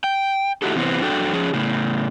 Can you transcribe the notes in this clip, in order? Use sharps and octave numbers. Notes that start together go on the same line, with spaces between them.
G5
A3 D#4 E4 F#4 G4 A4
C3 E3 B3 C4
F#2 D4 F#4 A4 G5
F3 C#4 G#4
A2 C#3